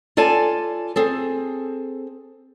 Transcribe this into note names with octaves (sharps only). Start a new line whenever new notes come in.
F4 A4 D5 G#5 A5
C4 G#4 A4